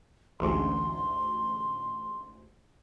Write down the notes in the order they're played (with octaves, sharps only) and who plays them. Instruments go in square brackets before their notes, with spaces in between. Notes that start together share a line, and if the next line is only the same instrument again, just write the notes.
[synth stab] A1 D2 G#2 [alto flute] C6